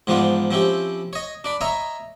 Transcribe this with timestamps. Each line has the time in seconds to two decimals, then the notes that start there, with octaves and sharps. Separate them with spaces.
0.07 G#2 E3 F3 B3 D4 F4
0.51 F3 C4 C#4 E4 G4
1.13 C#5 D#5
1.44 D4 D5 B5
1.61 C#5 D#5 E5 A#5 B5